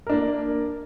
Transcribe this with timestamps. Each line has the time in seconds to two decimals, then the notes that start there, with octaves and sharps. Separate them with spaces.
0.07 A#4
0.09 D4
0.12 A#3